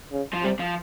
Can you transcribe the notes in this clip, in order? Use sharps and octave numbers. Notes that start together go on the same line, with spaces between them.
C#3
F3
C3 G3
F3